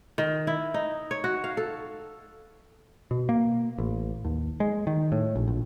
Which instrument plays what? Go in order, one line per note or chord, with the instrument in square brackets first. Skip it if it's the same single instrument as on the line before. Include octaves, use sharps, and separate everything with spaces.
[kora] D#3
E4
D#4
C#5
F#4
F5
A4
[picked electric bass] B2
A#3
A1
D#2
G#3
D#3
A2
A#1
A#1